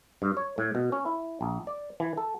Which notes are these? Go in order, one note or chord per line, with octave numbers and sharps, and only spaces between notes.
G2
C#5
A2
B2
C#4
E4
A#1
D5
E3
A4